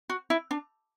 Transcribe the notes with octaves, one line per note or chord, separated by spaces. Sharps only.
F#4
E4
D4